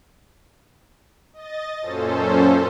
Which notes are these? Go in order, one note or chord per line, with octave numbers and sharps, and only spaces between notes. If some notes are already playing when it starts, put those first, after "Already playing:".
D#5 A6
F#2 A#2 C#4 A4 C5